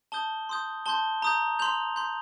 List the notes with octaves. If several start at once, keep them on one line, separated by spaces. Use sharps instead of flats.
A5 D#6 G6 G7
C6 D#6 G6
A5 C6 G6 G7
A#5 D#6 G6
C6 G6 F7
C6 G6